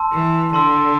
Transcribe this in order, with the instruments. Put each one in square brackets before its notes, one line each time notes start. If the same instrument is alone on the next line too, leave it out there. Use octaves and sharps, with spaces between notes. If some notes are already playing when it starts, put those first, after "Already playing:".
Already playing: [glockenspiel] A5 C6 E6
[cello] E3
[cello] D3 [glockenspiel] A5 C6 E6